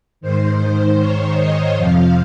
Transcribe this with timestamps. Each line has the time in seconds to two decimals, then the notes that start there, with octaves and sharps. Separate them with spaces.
0.21 G#2 D#3 C5
0.99 C#5
1.37 D#5
1.76 F2 C3 F3 F5